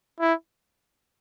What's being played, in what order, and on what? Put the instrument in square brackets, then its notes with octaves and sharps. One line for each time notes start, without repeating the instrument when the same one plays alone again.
[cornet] E4